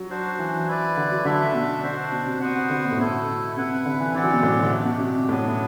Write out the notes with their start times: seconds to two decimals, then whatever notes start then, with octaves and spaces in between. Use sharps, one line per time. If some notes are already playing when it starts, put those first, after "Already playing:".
Already playing: F#3
0.10 D4 F#4 C5
0.39 E3
0.68 E4 B4 D5
0.97 D3
1.11 F#3
1.25 D3 A3 D4 A4 E5
1.54 B2
1.83 D4 F#4 C5
2.12 B2
2.26 C3
2.41 B3 F#4 C5 F#5
2.70 D3
2.85 B2
2.92 A2
2.98 B2 A3 E4 A4
3.56 C3 E4 B4 F#5
3.86 D3
4.00 E3
4.14 E3 C4 G4 D5 F#5
4.24 F#3
4.33 B2
4.43 A2
4.53 B2
4.62 D3
4.71 A3 D4 G4
4.85 B2
5.00 C3
5.29 A2 F#3 B3 D4
5.44 B2